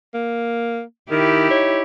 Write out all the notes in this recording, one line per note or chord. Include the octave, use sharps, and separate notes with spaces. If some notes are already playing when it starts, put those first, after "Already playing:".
A#3
D#3 D#4 E4 G4
C#5